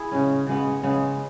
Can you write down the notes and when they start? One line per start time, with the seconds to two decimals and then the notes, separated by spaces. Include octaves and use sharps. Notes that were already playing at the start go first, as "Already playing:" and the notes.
Already playing: E4 G#4
0.12 C#3 G#3 C#4
0.47 C#3 G#3 B3
0.83 C#3 G#3 B3